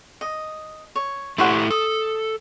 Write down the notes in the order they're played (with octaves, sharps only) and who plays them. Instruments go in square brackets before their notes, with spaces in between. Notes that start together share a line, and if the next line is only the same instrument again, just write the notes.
[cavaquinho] D#5
C#5
[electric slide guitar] A3 E4 G4 [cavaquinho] C5 C#5 F#5
[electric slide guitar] A4 [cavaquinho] D#6